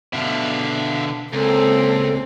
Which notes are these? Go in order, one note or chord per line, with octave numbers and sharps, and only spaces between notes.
B2 D3 E5 F5
C#2 A#2 C4 A4